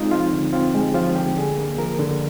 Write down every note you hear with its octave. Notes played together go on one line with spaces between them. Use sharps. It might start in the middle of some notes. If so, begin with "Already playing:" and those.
Already playing: G#3 C4 D#4 F4
F3 F4
D3
C4 F4
G#3 G4
F3 F4
D3 G4
D3 G#4
A#3
F3 A#4
D3